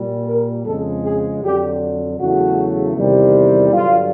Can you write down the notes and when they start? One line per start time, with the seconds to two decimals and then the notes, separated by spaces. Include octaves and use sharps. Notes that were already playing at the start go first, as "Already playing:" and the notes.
Already playing: A#2 G3
0.28 A#4
0.65 F2 C#3 F3 G#3 A4
1.04 G#4
1.42 F2 D3 F#3 G4
2.18 E2 C#3 F#3 A3 F#4
2.95 E2 C3 D#3 G3
3.72 G2 D3 F#3 F4